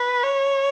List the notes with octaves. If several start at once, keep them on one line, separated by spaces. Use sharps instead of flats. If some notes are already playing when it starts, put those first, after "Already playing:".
Already playing: B4
C#5